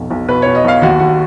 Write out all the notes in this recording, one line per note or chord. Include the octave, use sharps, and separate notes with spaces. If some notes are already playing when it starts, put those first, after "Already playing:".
Already playing: F1 B1 B2
B1
B2 B4
B2 C#5
D#5
B1 F5
D#2 F#4
D#2 F#4